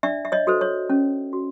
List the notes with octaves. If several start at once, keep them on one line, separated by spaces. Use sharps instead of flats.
D4 D5 E5
E5
C#5 D#5
F#4 A4 C5
C#5
C#4
F#4